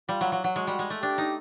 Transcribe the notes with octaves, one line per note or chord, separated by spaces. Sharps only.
G3 F4
F#3
F#3
F#3
G#3 F#4
G3
G#3
A3
D4 G4
D#4